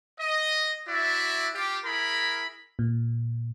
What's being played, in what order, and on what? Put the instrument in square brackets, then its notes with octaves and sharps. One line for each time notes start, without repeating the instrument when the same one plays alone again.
[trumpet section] D#5
E4 F#4 D5 E5
F4 G4
E4 G#4 A#4 B5
[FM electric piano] A#2